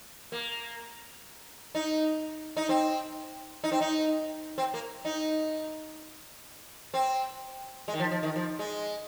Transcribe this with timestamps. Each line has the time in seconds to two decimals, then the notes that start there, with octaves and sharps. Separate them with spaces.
0.32 A#3
1.75 D#4
2.57 D#4
2.69 C4
3.64 D#4
3.72 C4
3.81 D#4
4.58 C4
4.74 A#3
5.05 D#4
6.94 C4
7.88 G#3
7.93 D#3
8.00 F3
8.11 F3
8.23 D#3
8.36 F3
8.59 G#3